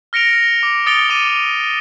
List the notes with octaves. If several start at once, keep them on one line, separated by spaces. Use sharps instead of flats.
F6 A#6 C#7 D7 F7
D6
D#6 A6 C#7 D7 F7 G7
D6 D#7